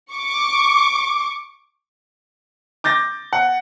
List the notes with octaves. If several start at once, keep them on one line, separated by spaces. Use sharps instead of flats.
C#6 D6
D6 G6 A6 A#6
F#5